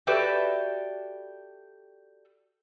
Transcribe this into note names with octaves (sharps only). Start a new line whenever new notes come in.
F#4 G4 A4 B4 D5 E5